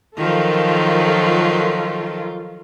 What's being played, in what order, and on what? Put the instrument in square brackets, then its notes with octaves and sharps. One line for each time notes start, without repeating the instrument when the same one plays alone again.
[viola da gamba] D#3 F3 F#3 [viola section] F4 A4 A#4